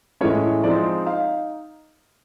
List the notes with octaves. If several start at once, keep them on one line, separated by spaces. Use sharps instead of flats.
A2 E3 G#3 C#4 C#5
F3 G#3 C4 D#4 D5
D#4 F5